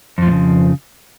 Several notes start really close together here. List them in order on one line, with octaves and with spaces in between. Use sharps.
F2 F3 A2 C#3